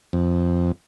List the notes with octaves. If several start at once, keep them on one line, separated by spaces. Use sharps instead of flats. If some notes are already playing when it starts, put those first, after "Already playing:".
F2